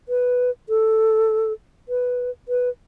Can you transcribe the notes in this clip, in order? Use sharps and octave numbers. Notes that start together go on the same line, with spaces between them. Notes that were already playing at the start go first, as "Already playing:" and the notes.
B4
A4
B4
B4